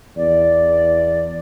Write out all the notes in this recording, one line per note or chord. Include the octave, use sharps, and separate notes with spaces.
E2 D5